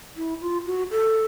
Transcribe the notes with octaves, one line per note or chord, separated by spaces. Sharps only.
E4
F4
F#4
A4